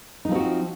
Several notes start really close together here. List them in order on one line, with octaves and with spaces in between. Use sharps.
D#4 F3 C4 F#4